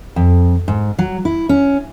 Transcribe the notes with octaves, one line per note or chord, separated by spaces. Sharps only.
F2
G#2
F#3
E4
C#4